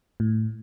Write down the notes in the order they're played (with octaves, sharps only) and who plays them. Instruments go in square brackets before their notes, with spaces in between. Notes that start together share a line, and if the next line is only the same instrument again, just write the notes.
[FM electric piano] A2